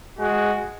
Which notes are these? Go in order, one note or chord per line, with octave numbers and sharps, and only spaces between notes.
G#3 F#4